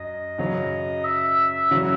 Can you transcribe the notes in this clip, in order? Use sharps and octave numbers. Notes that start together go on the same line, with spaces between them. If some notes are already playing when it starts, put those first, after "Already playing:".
Already playing: F#2 D#5
F#2 C#3 F#3
E5
C#3 F#3 C#4 F#4 E5